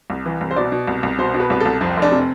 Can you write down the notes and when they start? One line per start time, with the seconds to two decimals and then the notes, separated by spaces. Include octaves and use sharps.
0.10 C2
0.25 E3
0.41 C2
0.51 C5
0.56 B2 D5
0.72 B2
0.88 C2
1.03 C2
1.18 B2 C5
1.34 B2
1.40 B4
1.50 C2 B4
1.60 C2 A4
1.81 F2 C4
1.97 F1
2.02 D4
2.12 C3